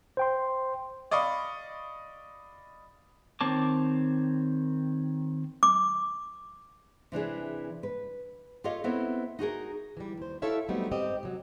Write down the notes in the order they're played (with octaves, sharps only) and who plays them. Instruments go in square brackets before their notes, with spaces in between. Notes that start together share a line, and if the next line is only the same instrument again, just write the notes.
[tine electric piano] C5 G5 C6
[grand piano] D5 D#5 F5 B5 C#6
[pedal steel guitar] D#3 C4 C#5 A5 D6
[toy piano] D6
[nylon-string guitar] C3 E3 D4 G#4
B4
F4 G4 A4 C#5 D#5 F5
B3 C4 E4 A4 C#5
D#4 F#4 G#4 A#4
[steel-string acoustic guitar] E3 G3
D#2 C5
E4 G4 A4 C#5 E5 F5
F#3 G3 A3 B3 C4 D#4
G#2 C4 G4 D#5
C3 F#3